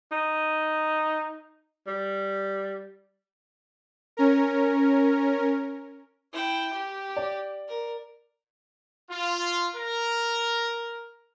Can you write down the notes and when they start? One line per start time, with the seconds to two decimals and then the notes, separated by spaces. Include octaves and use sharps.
0.12 D#4
1.87 G3
4.17 C#4 A#4
6.33 E4 G5
6.73 G4
7.17 D5
7.68 A#4
9.10 F4
9.74 A#4